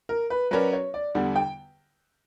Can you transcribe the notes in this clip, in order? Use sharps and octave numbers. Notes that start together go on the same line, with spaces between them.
A#4
B4
F#3 C#4 F#4 A#4 B4 D5
C#5
D5
E2 D3 G3 F#5
G5